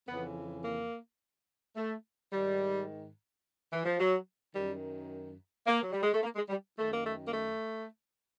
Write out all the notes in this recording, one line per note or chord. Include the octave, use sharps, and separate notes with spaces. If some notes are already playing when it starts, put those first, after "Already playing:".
F2 C#3 E3 B3
A#3
A3
G#2 D#3 G3
E3
F3
F#3
F#2 D#3 G3
A#3
F#3
G3
G#3
A3
A#3
G#3
G3
F#2 D#3 A3
A#3
A3
A#3
A3